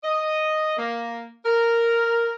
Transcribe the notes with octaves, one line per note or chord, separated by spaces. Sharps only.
D#5
A#3
A#4